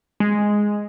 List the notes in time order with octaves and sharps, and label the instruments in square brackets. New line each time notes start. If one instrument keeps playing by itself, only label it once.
[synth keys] G#3